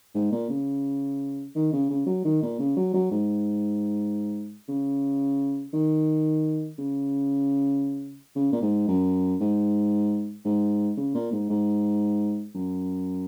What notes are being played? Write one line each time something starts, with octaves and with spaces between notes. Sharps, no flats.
G#2
A#2
C#3
D#3
C#3
C#3
F#3
D#3
A#2
C#3
F#3
F#3
G#2
C#3
D#3
C#3
C#3
A#2
G#2
F#2
G#2
G#2
C#3
A#2
G#2
G#2
F#2